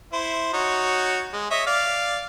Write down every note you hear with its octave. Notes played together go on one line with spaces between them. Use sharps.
E4 C5
D#4 F#4 C#5
G#3
C#5 D#5 E5
D5 F5